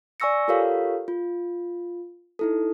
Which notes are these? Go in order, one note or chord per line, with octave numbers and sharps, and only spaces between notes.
D5 G#5 C#6 E6 A#6 C#7
F4 G4 A4 A#4 C#5 F5
F4
D#4 E4 A4